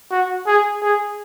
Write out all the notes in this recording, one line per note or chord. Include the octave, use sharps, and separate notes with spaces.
F#4
G#4
G#4